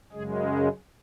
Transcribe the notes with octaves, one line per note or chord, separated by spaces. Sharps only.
F#2 C#3 G#3 G#4
G#4